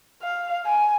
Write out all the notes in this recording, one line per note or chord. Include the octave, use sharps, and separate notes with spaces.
F5
G#5